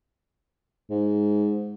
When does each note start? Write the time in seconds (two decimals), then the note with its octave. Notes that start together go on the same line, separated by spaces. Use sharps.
0.90 G#2